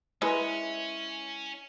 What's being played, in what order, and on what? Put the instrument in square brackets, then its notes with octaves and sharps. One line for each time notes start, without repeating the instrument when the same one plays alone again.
[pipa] G#3 [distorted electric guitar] C#4 [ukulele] E4 A#4 B4